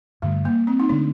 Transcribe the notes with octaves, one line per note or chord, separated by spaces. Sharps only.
G2 D3 G3 A3
A#3
C4
D#4
D3 A3 D4